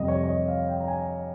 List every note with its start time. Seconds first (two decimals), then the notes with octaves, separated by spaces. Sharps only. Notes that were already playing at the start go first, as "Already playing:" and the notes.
Already playing: F2 C3 G3 D#5
0.08 C#5
0.23 C#5
0.29 D#5
0.48 F5
0.68 G5
0.80 A#5
0.88 G#5